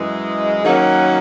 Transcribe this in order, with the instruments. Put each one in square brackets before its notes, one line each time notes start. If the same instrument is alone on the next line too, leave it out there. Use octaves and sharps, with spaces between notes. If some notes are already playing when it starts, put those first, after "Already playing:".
Already playing: [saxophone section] F#2 E3 G#3
D#3 F#3 A#3 C#4 F#4